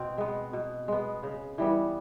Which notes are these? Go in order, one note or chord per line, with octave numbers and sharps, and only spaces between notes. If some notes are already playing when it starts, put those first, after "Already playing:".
Already playing: B2 C4
G#3 B3
B2
G#3 B3
C#3
E3 G3 B3